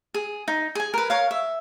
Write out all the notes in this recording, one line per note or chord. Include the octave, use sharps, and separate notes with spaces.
G#4
D#4
G#4 G#5
A#4 B4
A#4 C#5 F5
E5